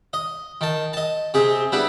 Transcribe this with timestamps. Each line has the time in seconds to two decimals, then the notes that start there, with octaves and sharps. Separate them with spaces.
0.13 D#5
0.61 D#3 A5
0.93 D#5 A5
1.34 C3 C4 G#4
1.72 G3 B3 D4 E4